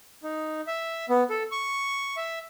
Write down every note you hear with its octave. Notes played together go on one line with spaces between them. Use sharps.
D#4
E5
B3
A4
C#6
E5